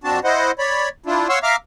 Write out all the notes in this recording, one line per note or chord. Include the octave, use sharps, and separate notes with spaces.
F2 C4 D4 F#4 A5
E4 C5 D#5 F#5
C#5 D5 B5
D4 E4 F4
C#5 F5 F#5 C6 C#6 E6
E5 F5 A#5 D6 F6